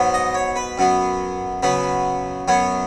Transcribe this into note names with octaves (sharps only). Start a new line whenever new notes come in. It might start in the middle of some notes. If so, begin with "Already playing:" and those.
Already playing: G#2 F#3 B3
D#5
C#5
B4
F#2 F#3 B3
C#3 F#3 B3 B4
F#2 F#3 B3 C#5